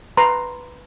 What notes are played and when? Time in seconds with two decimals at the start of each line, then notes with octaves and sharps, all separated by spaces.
0.17 B4 A#5 C6